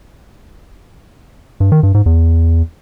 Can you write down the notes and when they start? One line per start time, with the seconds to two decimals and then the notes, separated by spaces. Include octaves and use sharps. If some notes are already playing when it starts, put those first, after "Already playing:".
1.60 G2
1.72 D#3
1.83 G2
1.94 G#2
2.06 E2